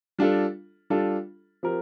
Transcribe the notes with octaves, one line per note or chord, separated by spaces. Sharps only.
G3 D4 F4 A4
G3 D4 F4 A4
F3 C4 G4 A#4